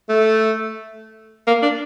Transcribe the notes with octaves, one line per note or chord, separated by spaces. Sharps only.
A3
A#3
D4